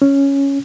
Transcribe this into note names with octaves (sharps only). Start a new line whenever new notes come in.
C#4